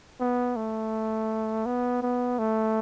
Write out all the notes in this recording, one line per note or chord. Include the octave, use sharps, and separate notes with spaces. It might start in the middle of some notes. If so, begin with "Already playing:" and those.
B3
A3
B3
B3
A3